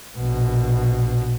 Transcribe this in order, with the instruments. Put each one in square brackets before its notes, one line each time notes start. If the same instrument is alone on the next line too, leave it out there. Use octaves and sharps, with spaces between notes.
[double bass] A#1 B2